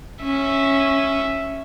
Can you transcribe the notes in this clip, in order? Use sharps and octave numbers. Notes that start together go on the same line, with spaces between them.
C#4 E5